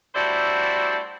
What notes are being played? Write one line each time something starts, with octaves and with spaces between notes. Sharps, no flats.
G3 A3 D4 E4 F#4 C5